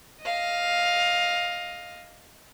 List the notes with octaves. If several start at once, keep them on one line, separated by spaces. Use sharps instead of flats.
D#5 F5